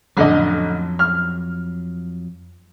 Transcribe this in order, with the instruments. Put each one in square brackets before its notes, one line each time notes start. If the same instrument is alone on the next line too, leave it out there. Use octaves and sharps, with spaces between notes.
[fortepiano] A1 D3 D#5 [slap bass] F2 F#3
[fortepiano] F6